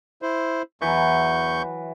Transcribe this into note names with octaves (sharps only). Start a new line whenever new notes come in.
E4 C5
E2 E3 F#3 C#6 G6